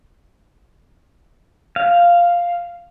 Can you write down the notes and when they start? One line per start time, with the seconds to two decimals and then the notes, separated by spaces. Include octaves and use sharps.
1.76 F5